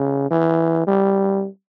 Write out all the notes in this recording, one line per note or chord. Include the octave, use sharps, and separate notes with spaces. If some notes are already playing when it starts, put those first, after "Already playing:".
Already playing: C#3
E3
G3